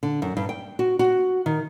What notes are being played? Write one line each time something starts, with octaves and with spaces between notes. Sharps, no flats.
D3
F#2
G2
G5
F#4
F#4
D#3